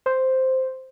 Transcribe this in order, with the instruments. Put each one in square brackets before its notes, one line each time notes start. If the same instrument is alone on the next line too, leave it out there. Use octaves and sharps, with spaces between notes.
[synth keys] C5